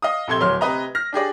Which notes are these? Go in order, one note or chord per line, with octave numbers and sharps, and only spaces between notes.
D#5 F5 D#6
A#1 C3 A4 C6 G#6 G7
D1 F#3 C6 F6
C3 B4 D#5 A#5
F6 A#6
D4 G4 G#4 D5